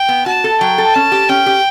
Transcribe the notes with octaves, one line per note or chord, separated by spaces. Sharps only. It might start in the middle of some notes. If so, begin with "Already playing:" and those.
Already playing: G5
B3
F#4 A5
A4
F#3 G5
A4
C#4 A5
G4
C#4 G5
G4